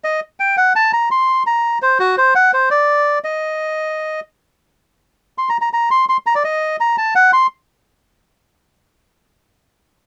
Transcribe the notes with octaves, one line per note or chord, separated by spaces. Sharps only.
D#5
G5
F#5
A5
A#5
C6
A#5
C5
F#4
C5
F#5
C5
D5
D#5
C6
A#5
A#5
A#5
C6
C6
A#5
D5
D#5
A#5
A5
F#5
C6